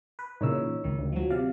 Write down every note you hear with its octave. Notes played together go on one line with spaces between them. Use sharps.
B4
A#2 C#3 E3 D#4 C#5 E6
C#2 D#3
D2
F3 F#3
C3 D5 F5